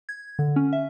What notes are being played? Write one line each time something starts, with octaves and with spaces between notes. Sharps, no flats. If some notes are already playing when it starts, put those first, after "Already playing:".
G#6
D3
C#4
E5